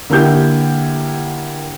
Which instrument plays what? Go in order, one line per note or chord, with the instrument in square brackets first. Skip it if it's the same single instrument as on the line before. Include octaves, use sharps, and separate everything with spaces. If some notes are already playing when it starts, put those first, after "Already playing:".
[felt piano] D3 A#3 E4 G4 G6